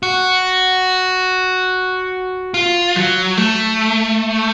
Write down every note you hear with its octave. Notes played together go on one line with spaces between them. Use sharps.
F#4
F4
F#3
A3